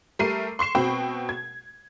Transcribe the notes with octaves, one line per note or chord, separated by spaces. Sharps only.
G3 A3 A#4 C7 D#7
C6 C#6 C7 E7
B2 C4 F#4 G5 B5 C#6
G#6